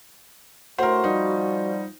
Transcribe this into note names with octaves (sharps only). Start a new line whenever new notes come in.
D2 A2 A3 F#4 A#4 C5 F#5 C6
F3 G3 D#4